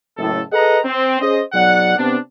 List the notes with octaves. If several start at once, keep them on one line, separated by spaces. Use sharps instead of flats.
F#1 A2 A4
G#4 A4 B4 D#5 F#5 A#5
C4
C#4 G#4 C5 D#5
B1 F#3 D5 F#5
C3 B3 C4 D4